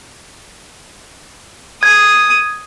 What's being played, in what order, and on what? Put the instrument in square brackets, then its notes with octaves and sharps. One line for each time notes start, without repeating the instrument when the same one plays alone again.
[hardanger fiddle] D#6 [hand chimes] G#6